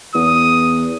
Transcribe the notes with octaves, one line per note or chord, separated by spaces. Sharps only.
E2 D#6